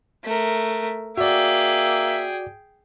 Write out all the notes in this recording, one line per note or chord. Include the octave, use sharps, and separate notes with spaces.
A3 A#4
A#3 F#4 G#4 D5 E5 G5